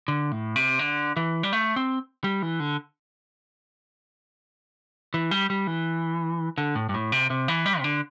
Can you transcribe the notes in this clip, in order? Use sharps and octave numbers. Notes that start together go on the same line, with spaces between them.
D3
A2
C3
D3
E3
G3
A3
C4
G3
E3
D3
E3
G3
G3
E3
D3
A2
G2
A2
C3
C3
E3
G3
C3
D3